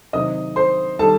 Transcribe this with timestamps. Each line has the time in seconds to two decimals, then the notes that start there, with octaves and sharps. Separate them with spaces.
0.13 C3 D#3 F#3 C4 D#5 D#6
0.56 C5 C6
0.99 D#3 G3 D#4 A4 A5